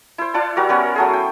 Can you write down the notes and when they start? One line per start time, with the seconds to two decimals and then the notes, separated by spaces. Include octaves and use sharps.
0.18 E4 C5
0.34 E4 D5 F#5 A5
0.56 G3 F#4 A#4 D6
0.69 B3 C#4 A#4
0.96 F#3 A3 G#4
1.13 G5